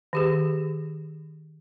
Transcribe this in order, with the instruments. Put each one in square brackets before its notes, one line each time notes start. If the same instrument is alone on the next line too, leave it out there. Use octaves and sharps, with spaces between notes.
[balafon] D#3 G4 G#4